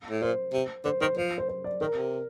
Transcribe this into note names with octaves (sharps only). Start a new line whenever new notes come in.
A2
A#2 C5
C3
D3 C5
D#3 C5
F3 C5
C5
C5
D5
D#3 A#4
C3